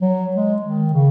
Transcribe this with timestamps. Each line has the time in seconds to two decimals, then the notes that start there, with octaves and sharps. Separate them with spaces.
0.01 F#3
0.36 G#3
0.62 D#3
0.93 C#3